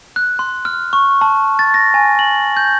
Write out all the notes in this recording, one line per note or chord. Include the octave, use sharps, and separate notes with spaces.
F#6
C6
F6
C#6
A5
A6
A#6
G#5
F#7
G6